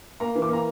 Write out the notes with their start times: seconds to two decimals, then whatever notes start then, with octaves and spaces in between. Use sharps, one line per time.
0.20 A#3 A#5
0.35 E3
0.42 D6
0.49 A#3 A#5